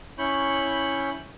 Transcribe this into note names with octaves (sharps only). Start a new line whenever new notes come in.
C#4 E4 C#5 B5 C#6 G6